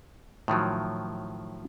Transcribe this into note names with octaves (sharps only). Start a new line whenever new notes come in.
A2 D#3 F3 F#3